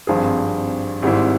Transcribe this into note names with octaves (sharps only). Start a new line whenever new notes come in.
G#1 G2 F3 C4 G#4
G#1 G#2 G3 C4 E4